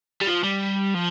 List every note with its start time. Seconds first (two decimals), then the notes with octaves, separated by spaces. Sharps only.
0.21 G3
0.27 F3
0.44 G3
0.95 F3